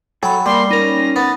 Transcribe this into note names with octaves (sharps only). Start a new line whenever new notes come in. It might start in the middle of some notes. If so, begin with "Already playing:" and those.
F#3 A4 G5 G#5 B5
G3 A#3 C6
C#4 D#4 A#4 A#6
B3 A6